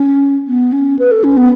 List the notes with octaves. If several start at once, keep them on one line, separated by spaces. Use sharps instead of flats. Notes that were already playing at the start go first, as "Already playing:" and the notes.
Already playing: C#4
B3
C#4
B4
A4
C#4
B3